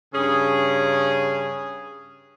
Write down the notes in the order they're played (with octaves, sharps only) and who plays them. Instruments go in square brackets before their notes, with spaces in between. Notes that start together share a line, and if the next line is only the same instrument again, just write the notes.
[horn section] G2 C#3 C#4 G#4